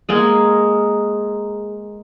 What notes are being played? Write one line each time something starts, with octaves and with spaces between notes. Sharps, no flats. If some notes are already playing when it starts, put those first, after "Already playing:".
G#3 A#3 G#4